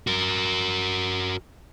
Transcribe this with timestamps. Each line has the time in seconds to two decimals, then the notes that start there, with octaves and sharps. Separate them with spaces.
0.07 F#4 A#4